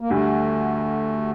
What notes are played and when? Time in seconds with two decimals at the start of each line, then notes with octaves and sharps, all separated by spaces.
0.01 A#3
0.10 D2 D3 G3 A3